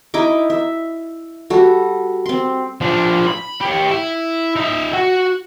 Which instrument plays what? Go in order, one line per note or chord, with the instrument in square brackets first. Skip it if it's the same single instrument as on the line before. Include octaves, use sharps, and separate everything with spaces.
[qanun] D#4 E4 D#5 D6
E5
G3 F#4 A4
C4 C6
[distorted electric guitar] F3 D4
B5
G4 C#5
E4
D#4 E5
F#4